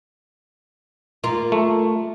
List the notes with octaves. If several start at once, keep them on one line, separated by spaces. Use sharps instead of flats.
A#3 F4
A3